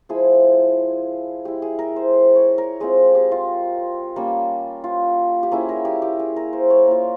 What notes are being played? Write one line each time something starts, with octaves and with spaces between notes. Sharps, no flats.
F3 G#3 E4 G#4
G#3 E4 G4
G#4
A#4
C5
C5
C#5
A#4
G#3 C4 F4 G#4
G4
F4
G3 A#3 C#4
F4
G4
A#3 C#4 E4 G#4
A#4
G4
G4
G#4
A#4
C5
C#5
A#3 F4